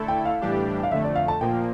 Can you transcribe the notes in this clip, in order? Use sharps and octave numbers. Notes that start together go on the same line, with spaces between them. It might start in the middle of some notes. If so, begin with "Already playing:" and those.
Already playing: D3 A3 E4 A4
G5
F5
A2 E3 G3 D4 G4
F5
F2 D3 A3 E5
D5
F5
A5
A#2 F3 A#3 G5